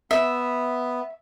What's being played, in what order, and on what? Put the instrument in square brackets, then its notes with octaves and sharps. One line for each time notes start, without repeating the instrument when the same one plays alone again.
[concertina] B3 [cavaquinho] E5